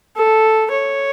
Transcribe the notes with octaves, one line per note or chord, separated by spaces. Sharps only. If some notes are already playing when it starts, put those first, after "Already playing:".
A4
C#5